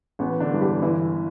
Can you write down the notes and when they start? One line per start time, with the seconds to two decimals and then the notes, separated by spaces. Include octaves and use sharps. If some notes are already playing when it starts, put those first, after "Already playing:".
0.19 A1 B3
0.40 D3 D4
0.51 G2 E3
0.61 G3 G4
0.82 G1 E3 E4